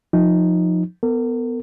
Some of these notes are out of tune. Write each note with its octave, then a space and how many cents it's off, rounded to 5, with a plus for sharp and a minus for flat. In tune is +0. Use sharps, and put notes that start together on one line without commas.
F3 +25 D#4 +0
B3 +10 A#4 -45